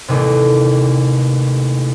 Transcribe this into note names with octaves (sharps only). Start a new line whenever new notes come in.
A1 D#2 C3